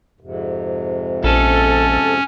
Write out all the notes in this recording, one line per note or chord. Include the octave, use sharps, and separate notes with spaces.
F2 G#2 C3
A#1 C#4 A4